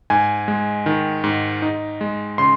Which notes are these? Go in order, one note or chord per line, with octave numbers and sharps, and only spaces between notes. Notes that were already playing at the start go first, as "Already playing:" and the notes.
G#2 G#5
G#3
D#3
G#2
D#4
G#3
C#3 C6